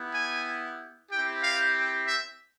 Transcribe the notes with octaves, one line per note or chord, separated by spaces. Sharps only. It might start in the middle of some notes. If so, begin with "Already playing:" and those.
Already playing: B3 E4 G4
G#5
C4 E4 G4 G5
F5
E5